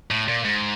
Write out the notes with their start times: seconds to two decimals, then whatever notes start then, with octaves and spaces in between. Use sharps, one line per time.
0.11 A2
0.28 A#2
0.45 G#2